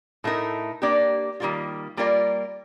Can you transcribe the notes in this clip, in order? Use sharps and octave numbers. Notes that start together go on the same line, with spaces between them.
A2 A3 D#4 A#4
A#3 D4 G4 D5
D#3 G3 A#3 F4
G3 A#3 F4 A#4 D5